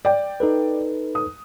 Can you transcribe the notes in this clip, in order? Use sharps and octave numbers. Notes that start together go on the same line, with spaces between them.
D5 G5
D#4 A4 B4
D#6